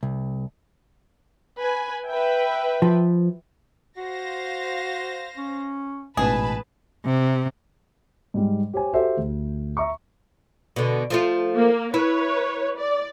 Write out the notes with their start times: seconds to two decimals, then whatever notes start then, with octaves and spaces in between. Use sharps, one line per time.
0.03 C2
1.58 B4 G#5
2.08 B4 E5 G5
2.82 F3
3.97 F#4 C5 F5 A#6
5.37 C#4
6.17 A1 G#2 B2 B3 G#4 B4 A5 B5
7.05 C3
8.34 G#2 G3 G#3
8.74 G4 C5 C#5 G#5
8.93 F#4 G4 A4 C5 E5
9.17 D2
9.77 E5 A#5 C#6
10.76 B2 D3
11.10 F3 A3 F4
11.55 A#3
11.94 E4 B4 C#5
12.79 D5